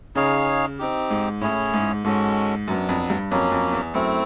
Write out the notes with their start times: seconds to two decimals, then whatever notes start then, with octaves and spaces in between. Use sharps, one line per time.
0.15 C#3 D#4 G#4 C#5 F5
0.79 C4 D#4 G4
1.10 G#2
1.41 A2 C#4 E4 G#4 C#5
1.74 G#2
2.04 G#2 G#3 C#4 F#4 A4
2.68 F#2 F#3 B3 D4
2.89 F2
3.10 G2
3.30 F2 F#3 A#3 C#4
3.52 F2
3.73 E2
3.93 F#2 A3 C4 E4